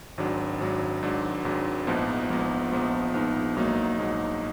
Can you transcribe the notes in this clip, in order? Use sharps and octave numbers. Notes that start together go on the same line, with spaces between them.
G#1 G#2 F#3 D4
G#1 G#2 F#3 D4
G#1 G#2 F#3 D4
G#1 G#2 F#3 D4
A#1 G#2 F3 B3 D#4
A#1 G#2 F3 B3 D#4
A#1 G#2 F3 B3 D#4
A#1 G#2 F3 B3 D#4
A#1 G#2 F#3 A#3 D#4
A#1 G#2 F#3 A#3 D#4